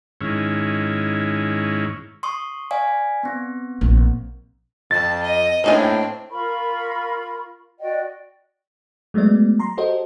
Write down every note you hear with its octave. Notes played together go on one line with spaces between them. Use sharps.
G#2 D#3 C#4 E4
C6 C#6 D#6
D5 F5 G#5
B3 C4
A#1
F2 A5 A6
D#5
A2 A#3 C4 D4 D#4 G#5
F4 A#4 B5 C#6
F#4 D5 D#5 G5
F#3 G#3 A3 B3 D5
A#5 C6
F#4 G4 A4 C5 D#5